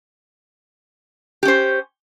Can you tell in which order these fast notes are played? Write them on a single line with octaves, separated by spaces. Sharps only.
G4 C#4 C5